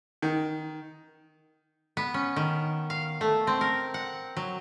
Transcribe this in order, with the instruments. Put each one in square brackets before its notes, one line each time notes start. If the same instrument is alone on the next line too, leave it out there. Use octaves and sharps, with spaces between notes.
[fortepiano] D#3
[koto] B3
C#4
D#3
F5
A3
C4
A#4
F#5
F#3